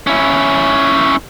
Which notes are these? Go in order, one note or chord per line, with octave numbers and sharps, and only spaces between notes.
C#4 E4